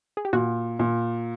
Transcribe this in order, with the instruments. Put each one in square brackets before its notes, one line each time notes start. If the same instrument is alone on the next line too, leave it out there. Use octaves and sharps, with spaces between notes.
[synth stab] G#4
G4
[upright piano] A#2 [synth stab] F#4
[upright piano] A#2